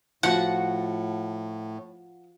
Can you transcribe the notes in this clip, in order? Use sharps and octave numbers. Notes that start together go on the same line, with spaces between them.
A2 F3 F#4 F#5